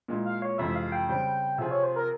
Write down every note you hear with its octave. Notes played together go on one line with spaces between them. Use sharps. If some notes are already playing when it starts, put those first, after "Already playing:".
A#2 G#3 E4
F5
C#5
F2 C3 E3 G#3 E4 E5
F5
G5
C#3 G3 C4 G5
C3 F3 C4 F4 G#4 E5
C#5
C5
A#4